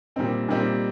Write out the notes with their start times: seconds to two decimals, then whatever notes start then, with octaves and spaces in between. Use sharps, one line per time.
0.16 A#2 G3 C4 D#4
0.49 A#2 G3 C4 D#4